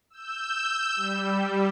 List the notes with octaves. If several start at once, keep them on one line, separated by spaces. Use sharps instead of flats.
E6 G6
G3